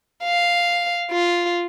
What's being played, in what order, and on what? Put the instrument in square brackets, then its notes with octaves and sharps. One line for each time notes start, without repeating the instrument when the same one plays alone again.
[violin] F5
F4